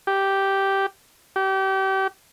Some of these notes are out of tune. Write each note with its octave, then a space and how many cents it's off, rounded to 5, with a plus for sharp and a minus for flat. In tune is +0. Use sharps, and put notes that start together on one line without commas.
G4 -5
G4 -30